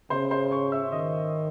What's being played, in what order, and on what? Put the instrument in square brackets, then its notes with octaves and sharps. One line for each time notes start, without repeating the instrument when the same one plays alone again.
[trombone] C#3 [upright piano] C5 C6
[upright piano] C5 C6
C#5 C#6
E5 E6
[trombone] D#3 [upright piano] D#5 D#6